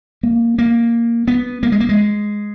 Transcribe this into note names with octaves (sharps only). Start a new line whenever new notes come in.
A#3
A#3
B3
A#3
G#3
A#3
G#3